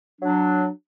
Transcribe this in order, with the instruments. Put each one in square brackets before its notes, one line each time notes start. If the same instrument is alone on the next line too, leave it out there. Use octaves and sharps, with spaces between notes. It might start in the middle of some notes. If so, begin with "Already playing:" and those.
[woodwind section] F#3 D4